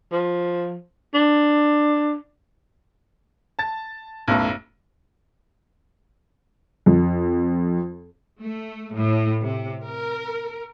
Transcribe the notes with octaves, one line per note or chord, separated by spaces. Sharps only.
F3
D4
A5 A6
B1 F#2 A2
F2
A3
A2
C3
A#4